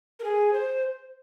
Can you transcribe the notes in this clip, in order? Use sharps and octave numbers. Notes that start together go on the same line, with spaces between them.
A#4
G#4
C5